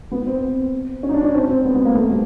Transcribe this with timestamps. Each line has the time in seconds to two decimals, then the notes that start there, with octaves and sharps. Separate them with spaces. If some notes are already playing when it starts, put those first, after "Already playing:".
0.11 B3
0.26 C4
1.03 C#4
1.09 D#4
1.14 D4
1.24 C#4
1.34 C4
1.49 C4
1.64 B3
1.75 B3
1.85 A#3
1.95 A3
2.10 G3